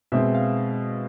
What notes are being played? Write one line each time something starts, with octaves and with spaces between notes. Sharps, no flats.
B2 G#3 C4 E5
F5